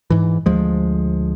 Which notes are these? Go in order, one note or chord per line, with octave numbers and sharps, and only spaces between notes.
G#2 E3
D2 F3 G#3